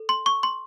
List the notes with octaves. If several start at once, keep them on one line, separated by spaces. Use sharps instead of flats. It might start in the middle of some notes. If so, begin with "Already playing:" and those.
Already playing: A4
C6
C#6
C6